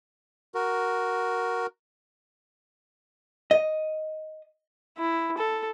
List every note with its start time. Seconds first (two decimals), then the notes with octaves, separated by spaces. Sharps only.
0.55 F#4 A#4
3.51 D#5
4.98 E4
5.38 A4